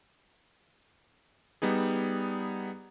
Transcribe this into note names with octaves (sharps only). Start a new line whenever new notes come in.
G3 B3 D#4 G#4